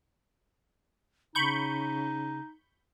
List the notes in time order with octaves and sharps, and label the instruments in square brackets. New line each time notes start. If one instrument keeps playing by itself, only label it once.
[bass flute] C#3 [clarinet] D#4 [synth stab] B5 C#6 G6